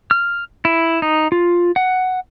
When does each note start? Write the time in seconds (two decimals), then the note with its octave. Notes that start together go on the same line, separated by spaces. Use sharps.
0.11 F6
0.65 E4
1.02 D#4
1.32 F4
1.76 F#5